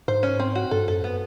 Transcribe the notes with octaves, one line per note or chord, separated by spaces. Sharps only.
G#2 C5
C#4
C4
F#4
G2 A4
F#2 A4
B3